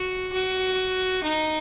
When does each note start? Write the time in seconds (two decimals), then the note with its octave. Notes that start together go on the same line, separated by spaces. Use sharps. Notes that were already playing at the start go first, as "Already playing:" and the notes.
Already playing: F#4
0.32 F#4
1.23 D#4